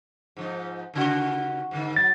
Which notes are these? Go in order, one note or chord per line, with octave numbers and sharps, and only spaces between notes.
G#2 F3 D#4
D#2 C#3 F#4
G#2 D3 D#3
F#3 A6